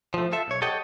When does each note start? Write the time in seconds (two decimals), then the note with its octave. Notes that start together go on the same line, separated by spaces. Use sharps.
0.14 F3 A3
0.32 F4 A4 E5
0.48 B1 C#5
0.62 G4 A4 C#5 D#5 F#5 G5